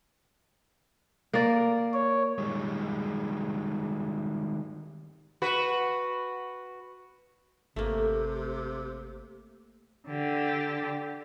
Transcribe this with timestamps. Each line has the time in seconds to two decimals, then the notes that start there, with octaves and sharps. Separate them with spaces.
1.33 A#3 D5
1.93 C#5
2.38 D#3 G3 G#3
5.42 F#4 B4
7.76 G#1 C3 A3 A#3
10.08 D3 G4